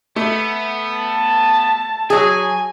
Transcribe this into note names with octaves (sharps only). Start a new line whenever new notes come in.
A3 B3
A5
F#3 G#4 G#5